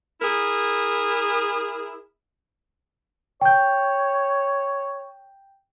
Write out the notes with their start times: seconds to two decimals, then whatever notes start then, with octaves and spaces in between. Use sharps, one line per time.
0.21 E4 G#4 A#4
3.41 C#5 G5 G6